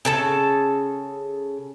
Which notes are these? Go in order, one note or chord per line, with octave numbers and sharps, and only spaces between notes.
C#3 A4 A5